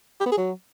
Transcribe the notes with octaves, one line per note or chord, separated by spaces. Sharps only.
G4
B3
G#4
F#3